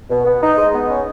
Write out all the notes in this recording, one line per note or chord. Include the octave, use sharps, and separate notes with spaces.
B2
B3
D#4
G#3
B3
C#4